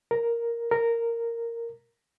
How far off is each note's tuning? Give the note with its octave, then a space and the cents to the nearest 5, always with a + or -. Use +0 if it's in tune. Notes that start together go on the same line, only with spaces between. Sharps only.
A#4 +0
A#4 -10